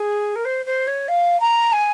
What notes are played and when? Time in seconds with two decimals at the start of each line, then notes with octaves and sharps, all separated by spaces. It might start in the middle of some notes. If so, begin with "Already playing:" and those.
Already playing: G#4
0.35 A#4
0.45 C5
0.65 C5
0.87 C#5
1.08 F5
1.40 A#5
1.72 G#5